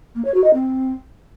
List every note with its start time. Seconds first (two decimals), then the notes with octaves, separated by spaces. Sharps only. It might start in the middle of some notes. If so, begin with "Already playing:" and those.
0.15 A#3
0.24 C#5
0.34 F#4
0.44 D#5
0.53 C4